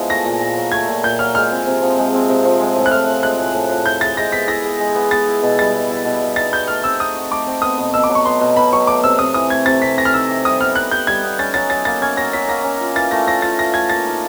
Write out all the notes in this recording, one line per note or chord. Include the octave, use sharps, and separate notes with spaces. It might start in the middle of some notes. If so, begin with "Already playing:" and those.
Already playing: F3 G#3 B3 E4
A3 A#6
A#2
A#2
F#3
A3 G#6
A#2
A#2 G6
F#3 F6
G#3 F6
C4
C3
F3
G#3
C4
C3
F3
G#3
A2
F#6
A2 F6
F3
G#3 F#6
A2
A2
F3
E4 G6
G#4 A6
G#3 A#6
B3 B6
E4 A#6
G#4
G#3
B3
B3 A6
E4
B2
G3 A6
B3
E4
B2
G3
D#4 A6
F#4 G6
A3 F6
C4 E6
D#4 D#6
F#4
A3 D6
C4
B3 D#6
B2
B2 E6
D6
F#3
C#6
B3 C6
B2
B2 B5
F#3 C#6
A3 D6
C3 E6
C3 D#6
E3 D#6
A3 G#6
C3 A6
C3 B6
E3 A#6
F6
D#4 E6
G4
G3 D#6
B3 F6
D#4 F#6
G4 G6
G3 G#6
B3
C#4 A6
F#3 A6
F#3 A6
A#3 A6
C#4 G#6
F#3 A#6
F#3 B6
A#3 A#6
C#4
F4
E3 A6
A3 A#6
C#4 A#6
F4 A6
E3 A#6
A3 G#6
A#3 A6
D#4